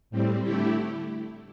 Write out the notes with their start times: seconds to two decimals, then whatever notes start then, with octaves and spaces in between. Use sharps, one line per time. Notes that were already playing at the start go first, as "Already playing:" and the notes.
0.10 A2 G3 C4
0.43 D3 A3 E4 G4